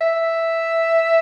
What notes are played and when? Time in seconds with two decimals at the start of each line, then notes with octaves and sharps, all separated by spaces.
0.01 E5